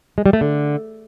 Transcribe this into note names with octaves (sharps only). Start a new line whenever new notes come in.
G#3
G3
A3
D3